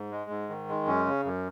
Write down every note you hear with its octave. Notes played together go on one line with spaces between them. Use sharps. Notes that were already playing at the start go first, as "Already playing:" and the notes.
Already playing: G#2
G#3
G#2
D#3
G#3
F#2 C#4
C#3
F#2